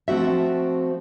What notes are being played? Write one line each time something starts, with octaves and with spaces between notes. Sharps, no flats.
F3 A3 C4 F#4 E5